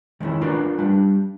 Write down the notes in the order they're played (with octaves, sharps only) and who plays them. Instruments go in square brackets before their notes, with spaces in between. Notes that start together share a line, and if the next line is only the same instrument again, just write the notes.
[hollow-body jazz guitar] D#3 G#3 A#3 C#4 E4
D4 F4 F#4 A#4 B4 D5
G3 D4